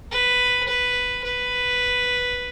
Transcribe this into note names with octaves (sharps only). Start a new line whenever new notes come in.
B4
B4
B4